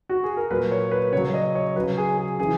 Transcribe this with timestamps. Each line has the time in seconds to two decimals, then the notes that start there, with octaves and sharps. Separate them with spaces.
0.09 F#4
0.23 G#4
0.37 A#4
0.50 A#2 F#3 B4
0.72 C#5
0.91 B4
1.12 C#3 C#5
1.17 F#3
1.34 D#5
1.55 C#5
1.76 C#3 F#3 B4
1.97 G#4
2.18 G#4
2.39 C#3 E3 G#4